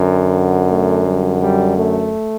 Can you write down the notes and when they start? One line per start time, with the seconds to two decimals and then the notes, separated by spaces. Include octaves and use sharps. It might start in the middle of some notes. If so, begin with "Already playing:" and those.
Already playing: F#2 D3
0.70 A3
1.07 G3
1.42 G3
1.78 A3